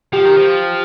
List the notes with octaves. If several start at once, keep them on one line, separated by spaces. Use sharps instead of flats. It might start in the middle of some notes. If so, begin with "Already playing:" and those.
F3 G4 G5
D#3
F3